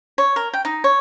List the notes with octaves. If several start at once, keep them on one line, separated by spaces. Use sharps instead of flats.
C#5
A#4
G5
D#4
C#5